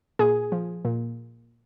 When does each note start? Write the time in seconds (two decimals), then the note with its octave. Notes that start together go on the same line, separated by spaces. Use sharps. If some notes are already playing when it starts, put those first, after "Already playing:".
0.19 A#2 G#4
0.52 F3
0.85 A#2